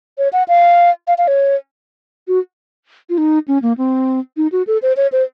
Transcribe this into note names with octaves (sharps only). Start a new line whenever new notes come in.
C#5
F#5
F5
F5
F5
C#5
F#4
F4
D#4
C#4
A#3
C4
D#4
F#4
A4
C5
C#5
C5